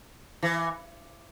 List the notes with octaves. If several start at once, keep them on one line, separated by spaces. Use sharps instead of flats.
E3